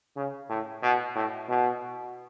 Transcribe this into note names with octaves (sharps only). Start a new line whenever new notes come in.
C#3
A2
B2
A2
B2